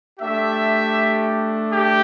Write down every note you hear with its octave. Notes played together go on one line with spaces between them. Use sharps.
A3 D4 G4 E5
G4